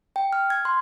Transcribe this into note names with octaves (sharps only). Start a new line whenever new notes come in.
G5
F6
G#6
C6